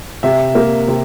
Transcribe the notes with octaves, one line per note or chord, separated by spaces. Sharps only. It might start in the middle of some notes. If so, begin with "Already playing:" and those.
C3 E5
A#3
C3